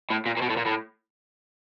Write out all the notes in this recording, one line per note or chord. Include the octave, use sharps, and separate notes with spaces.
A2
A#2
A#2
B2
A2
A#2
A2